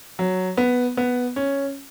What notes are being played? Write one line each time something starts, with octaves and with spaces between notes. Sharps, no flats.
F#3
B3
B3
C#4